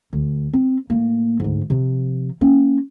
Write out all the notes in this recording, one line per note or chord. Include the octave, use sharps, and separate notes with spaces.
D2
C4
A2 A#3
D2 G#2
C3 F3
A#3 C#4